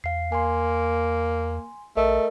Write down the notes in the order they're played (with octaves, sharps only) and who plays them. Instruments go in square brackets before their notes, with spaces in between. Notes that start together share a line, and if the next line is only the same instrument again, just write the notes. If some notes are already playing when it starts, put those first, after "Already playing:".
[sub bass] E2 [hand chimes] F5 C7
[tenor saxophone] A#3 [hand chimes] G#5 C6
[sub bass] A#1 [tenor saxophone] A3 [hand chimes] A#4 D#5